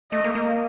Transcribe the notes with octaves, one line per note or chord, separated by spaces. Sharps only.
A3 D#5
A#3
A#3